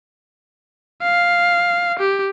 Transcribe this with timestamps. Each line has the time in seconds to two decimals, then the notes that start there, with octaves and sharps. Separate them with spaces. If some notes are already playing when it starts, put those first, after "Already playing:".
1.02 F5
1.99 G4